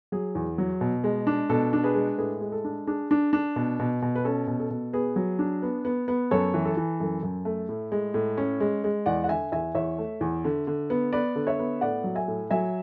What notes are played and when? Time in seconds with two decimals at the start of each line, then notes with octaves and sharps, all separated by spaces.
0.12 F#3 G#4
0.35 E2
0.58 F#3
0.81 B2
1.04 G#3
1.27 D4
1.50 B2 A4
1.73 D4
1.84 G#4 B4
1.95 G#3
2.18 A2 G#4 B4
2.41 G#3
2.52 A4
2.64 D4
2.87 D4 G#4
3.11 D4
3.33 D4
3.56 B2
3.79 B2
4.02 B2
4.16 B4
4.25 C#4 A4
4.47 B2
4.60 A4
4.71 B2
4.93 B3 G#4 B4
5.16 F#3
5.39 D4
5.62 B3
5.85 B3
6.08 B3
6.31 F#2 A4 C#5
6.54 E3
6.65 A4
6.77 E3
7.00 F#2 A4
7.23 F#2
7.45 A3
7.69 A2
7.92 G#3
8.14 A2
8.38 C#4
8.60 G#3
8.84 G#3
9.06 E2 D5 F#5
9.24 F#5
9.29 D3 E5 G#5
9.52 E2 E5 G#5
9.75 E2 C#5 E5
9.98 A3
10.21 E2
10.45 D3
10.67 D3
10.90 B3
11.13 B3 B4 D5
11.36 D3
11.47 C#5 E5
11.59 B3
11.81 A2 D5 F#5
12.04 F#3
12.15 E5 G#5
12.28 A2
12.51 F#3 E5 G#5